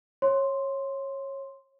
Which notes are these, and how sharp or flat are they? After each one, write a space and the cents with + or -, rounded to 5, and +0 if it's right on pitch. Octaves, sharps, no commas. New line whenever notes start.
C#5 -20 C6 +0